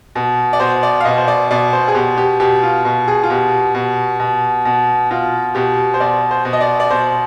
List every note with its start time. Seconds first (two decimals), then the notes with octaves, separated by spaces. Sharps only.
0.15 B2
0.53 D5
0.60 B2 C5
0.83 D5
1.01 F5
1.04 B2 D#5
1.18 C5
1.28 D5
1.51 B2 D5
1.73 C5
1.88 G#4
1.95 B2 G4
2.17 G4
2.40 B2 G4
2.63 F4
2.85 B2
3.08 G#4
3.23 F4
3.30 B2 G4
3.75 B2
4.20 B2
4.65 B2
5.11 B2 F4
5.55 B2 G4
5.94 C5
6.00 B2 D5
6.31 C5
6.45 B2
6.53 D#5
6.61 D5
6.80 D5
6.90 B2 C5